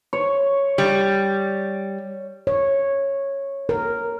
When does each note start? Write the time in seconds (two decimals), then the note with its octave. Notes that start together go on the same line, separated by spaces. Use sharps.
0.13 C#5
0.78 G3
2.47 C#5
3.69 A#4